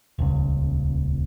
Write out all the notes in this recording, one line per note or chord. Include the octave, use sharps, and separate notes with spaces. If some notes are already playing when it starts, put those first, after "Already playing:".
D#1 C#2